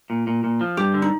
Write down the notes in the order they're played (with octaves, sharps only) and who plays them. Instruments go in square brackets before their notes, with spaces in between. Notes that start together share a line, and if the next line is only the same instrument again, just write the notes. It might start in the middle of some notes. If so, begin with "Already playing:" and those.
[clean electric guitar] A#2
A#2
A#2
F3
[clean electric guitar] G2 [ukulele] G4
[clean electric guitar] D3
[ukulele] D#4